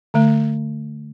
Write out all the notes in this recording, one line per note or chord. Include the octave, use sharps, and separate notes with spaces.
D3 A3